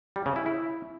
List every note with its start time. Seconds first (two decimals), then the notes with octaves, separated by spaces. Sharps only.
0.16 G3
0.26 C#3
0.36 E4
0.46 E4